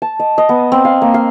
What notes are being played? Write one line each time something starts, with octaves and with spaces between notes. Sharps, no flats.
A5
D#5
D#5
B3
C4
F5
A#3
F5